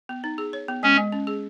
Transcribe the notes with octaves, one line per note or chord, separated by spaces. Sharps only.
B3
D#4
G#4
C#5
B3
G#3 C#4
G#3
C#4
G#4